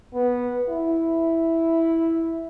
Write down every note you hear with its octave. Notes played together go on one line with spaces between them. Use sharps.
B3
E4